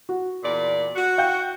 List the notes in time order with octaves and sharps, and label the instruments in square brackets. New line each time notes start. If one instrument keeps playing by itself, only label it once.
[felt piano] F#4
[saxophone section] E2 A#2 D5
F#4
[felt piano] F5 G5 G6